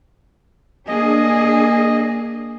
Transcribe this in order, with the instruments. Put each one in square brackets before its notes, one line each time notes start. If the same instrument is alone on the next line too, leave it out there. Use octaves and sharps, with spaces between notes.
[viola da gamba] A#3 [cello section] D4 G#4 [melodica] D#5